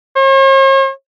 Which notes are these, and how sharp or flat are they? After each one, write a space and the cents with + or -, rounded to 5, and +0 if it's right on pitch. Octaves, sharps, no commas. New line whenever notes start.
C#5 -45